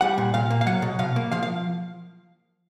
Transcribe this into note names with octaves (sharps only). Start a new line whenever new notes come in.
G3 F#5
A#2
A#2 F5
A#3
F5
F#3 F#5
B2
B2 F5
A#3
F3 F5
F5